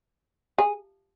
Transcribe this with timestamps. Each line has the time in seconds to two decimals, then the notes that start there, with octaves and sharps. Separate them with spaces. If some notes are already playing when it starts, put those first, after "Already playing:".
0.58 G#4